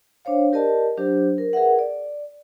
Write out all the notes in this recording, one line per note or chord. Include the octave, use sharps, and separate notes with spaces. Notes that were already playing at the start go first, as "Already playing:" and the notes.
D4 C5 C#5 F5
G4 A#4 D5 D#5 A5
F#3 D4 G4 C5
A#4
G#4 A#4 B4 E5 F#5
D5